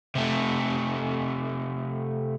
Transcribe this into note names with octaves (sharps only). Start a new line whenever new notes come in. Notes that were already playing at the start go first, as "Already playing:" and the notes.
C3 A3